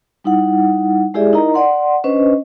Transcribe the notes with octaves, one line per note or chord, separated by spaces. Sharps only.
G3 D#4 E4 F#5
G#3 E4 G4 G#4 D5 E5
D#4 E4 A#4 D#5 A#5
D5 F#5 C6
C#4 D4 B4 C5 D#5